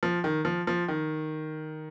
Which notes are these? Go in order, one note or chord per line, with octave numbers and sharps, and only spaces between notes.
F3
D#3
F3
F3
D#3